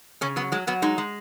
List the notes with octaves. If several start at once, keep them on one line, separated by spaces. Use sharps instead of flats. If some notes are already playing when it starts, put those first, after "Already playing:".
C#3 C#4
F#3 B3
F#3 G#3
F#3 B3
G#3 D#4
G#3